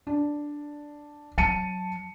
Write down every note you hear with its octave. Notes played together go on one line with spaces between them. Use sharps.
D4
F#3 A5 C#7 D#7